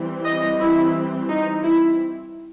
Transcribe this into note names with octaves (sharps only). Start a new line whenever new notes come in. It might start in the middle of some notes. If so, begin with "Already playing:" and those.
Already playing: E3 G3 C4
D#5
E4
D#4
E4